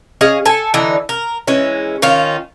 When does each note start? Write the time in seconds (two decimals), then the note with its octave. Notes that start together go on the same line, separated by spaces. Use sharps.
0.21 C#4 G#4 D#5 F5
0.46 A4 G#5
0.74 D3 E3 D#4
1.09 A#4
1.47 E3 G#3 C#4
2.02 D#3 C#4 F4